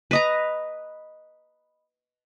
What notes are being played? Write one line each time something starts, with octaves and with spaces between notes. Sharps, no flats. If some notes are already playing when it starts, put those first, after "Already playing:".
B4 D#5 A#5